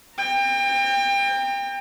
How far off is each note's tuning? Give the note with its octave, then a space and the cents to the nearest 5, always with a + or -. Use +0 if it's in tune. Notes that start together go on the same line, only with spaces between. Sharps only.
G5 +30 A#5 -25